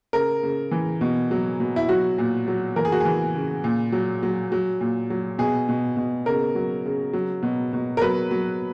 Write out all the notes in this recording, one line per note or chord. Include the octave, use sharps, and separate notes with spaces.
C#3 A#4
C#3
E3
B2
F#3
B2
E4
F#3 F#4
A#2
F#3
E3 A#4
G#4
F#4
E3 G#4
C#3
A#2
F#3
F#3
F#3
A#2
F#3
B2 G#4
B2
B2
C#3 A#4
F#3
C#3
F#3
B2
B2
A#4
F#3 B4
F#3